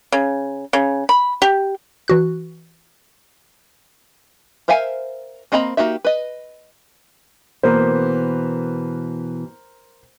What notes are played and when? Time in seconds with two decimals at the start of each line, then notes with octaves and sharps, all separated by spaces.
0.12 C#3
0.73 C#3
1.09 B5
1.42 G4
2.08 E3 F#4 F#6
4.68 A#4 C5 E5 F5 G#5
5.52 A#3 C4 D#5 A#5 B5
5.77 A#3 D#4 F#4 G4 E5
6.05 B4 D#5
7.63 B2 E3 A#3 A#4 C5